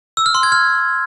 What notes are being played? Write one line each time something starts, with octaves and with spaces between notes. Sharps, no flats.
E6
F6
C6
G#6
F6